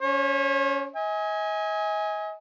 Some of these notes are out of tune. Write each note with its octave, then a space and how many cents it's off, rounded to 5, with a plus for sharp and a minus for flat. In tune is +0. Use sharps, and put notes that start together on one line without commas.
C#4 +20 C#5 -40
D#5 +40 G#5 -5